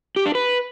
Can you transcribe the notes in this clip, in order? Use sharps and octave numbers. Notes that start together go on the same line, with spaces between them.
G4
D4
B4